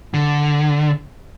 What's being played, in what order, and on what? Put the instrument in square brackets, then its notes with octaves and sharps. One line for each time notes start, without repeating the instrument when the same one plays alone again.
[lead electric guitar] D3